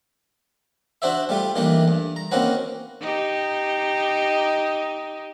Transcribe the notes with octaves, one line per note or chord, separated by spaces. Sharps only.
D4 F#4 C5 D5 E5
G3 A3 F4 G4
D#3 E3 G3 A3 A#3 D4
G2
A#5
D#3 A#3 C4 C#4 F#4 B4
D#4 G4